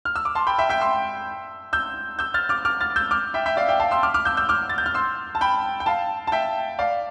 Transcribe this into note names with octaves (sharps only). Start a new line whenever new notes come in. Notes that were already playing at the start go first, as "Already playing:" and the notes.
F6
E6
D6
A5 C6
G5 B5
E5 G5
E5 G5
C6 E6
E6 G6
E6 G6
F6 A6
D6 F6
D6 F6
F6 A6
E6 G6
D6 F6
E5 G5
E5 G5
D5 F5
E5 G5
F5 A5
C6 E6
D6 F6
D6 F6
E6 G6
E6 G6
D6 F6
A6
G6
F6
C6 E6
A5
G5 B5
G5
F5 A5
A5
E5 G5
D5 F5